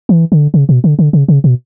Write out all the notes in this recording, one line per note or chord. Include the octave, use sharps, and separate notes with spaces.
E3
D3
C#3
B2
D3
D3
C#3
C#3
B2